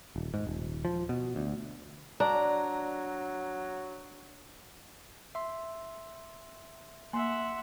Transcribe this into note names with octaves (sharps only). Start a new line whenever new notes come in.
D#1
G#2
D#1
F3
B2
D2
F#3 D4 A#5
E5 C6
A#3 E5 F#5 C6